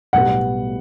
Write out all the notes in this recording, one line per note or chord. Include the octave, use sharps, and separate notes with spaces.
B1 A2 G3 B3 F#5